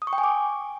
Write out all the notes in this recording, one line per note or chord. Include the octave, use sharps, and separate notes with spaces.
D#6
C#6
G5
G#5
D6